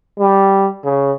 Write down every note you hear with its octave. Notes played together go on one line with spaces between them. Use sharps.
G3
C#3